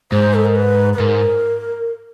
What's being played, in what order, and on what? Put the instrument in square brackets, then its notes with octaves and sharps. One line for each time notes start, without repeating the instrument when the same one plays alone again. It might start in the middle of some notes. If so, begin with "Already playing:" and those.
[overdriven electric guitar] G#2 [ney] C5
[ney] A4
A#4
B4
B4
[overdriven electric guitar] G#2 [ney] A#4